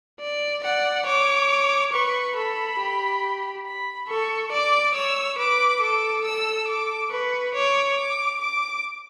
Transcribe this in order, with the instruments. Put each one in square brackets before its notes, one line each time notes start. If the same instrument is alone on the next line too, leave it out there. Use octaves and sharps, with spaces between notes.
[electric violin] D5
[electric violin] D5 [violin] F#5
[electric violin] C#5 [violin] D6
[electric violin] B4 [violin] C#6
[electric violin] A4 [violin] B5
[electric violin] G4
[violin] B5
[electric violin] A4 [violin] C#6
[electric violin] D5 [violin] D6
[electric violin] C#5 [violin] E6
[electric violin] B4 [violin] D6
[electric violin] A4 [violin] D6
[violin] E6
D6
[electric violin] B4 [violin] C#6
[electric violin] C#5 [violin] D6
[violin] D6
D6